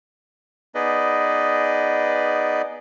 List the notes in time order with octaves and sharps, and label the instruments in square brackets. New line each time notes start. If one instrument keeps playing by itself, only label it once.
[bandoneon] B3 D#4 G#4 B4 D5 D#5